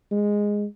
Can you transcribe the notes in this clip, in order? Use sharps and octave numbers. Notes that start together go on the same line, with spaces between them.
G#3